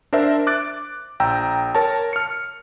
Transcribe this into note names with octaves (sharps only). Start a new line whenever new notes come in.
D4 A#4 C5 E5
D6 F#6 A6 D7
A#1 G5 A#5 E6
A#4 C#5 A5
F6 C#7